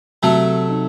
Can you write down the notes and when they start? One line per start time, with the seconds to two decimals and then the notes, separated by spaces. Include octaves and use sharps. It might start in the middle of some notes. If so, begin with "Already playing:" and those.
0.23 C3 F#3 A3
0.69 D#4